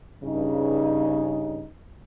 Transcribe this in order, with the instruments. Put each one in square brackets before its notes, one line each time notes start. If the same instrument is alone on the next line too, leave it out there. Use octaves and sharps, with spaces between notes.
[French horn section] G2 C#3 D#4